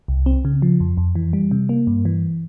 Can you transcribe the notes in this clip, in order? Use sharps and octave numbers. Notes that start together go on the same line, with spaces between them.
C2
C4
C#3
F3
F2
F2
E3
G3
C3
A#3
G2
E3